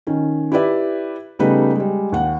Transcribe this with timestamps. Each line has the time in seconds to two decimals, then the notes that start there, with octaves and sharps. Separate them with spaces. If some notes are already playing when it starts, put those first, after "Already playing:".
0.07 D#3 C#4
0.52 E4 G4 B4 D5 E5
1.39 C#3 G3 A3 B3 D#4 B4
1.75 G3 G#3
2.12 D#2 F#5